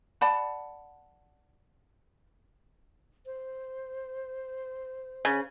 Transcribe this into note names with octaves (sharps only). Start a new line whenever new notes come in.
D5 F#5 A5 B5
C5
C#3